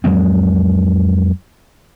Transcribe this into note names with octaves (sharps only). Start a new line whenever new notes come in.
F2 F#3 G#3 C4